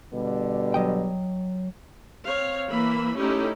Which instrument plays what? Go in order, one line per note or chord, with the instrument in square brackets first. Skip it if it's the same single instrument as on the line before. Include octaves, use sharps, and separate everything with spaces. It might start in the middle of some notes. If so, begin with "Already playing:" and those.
[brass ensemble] B2 D3 G3
[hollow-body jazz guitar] F#3 D#5 G5
[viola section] C4 C#5 F5
E3 A#3 E5 B5
A3 C#4 D#4 E4 G4